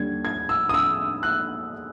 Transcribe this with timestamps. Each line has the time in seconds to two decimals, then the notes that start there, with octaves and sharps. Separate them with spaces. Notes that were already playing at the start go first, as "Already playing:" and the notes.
Already playing: D#2 D3 G3 G#6
0.25 G#6
0.49 E6
0.69 D#6
0.74 E6
1.23 F#6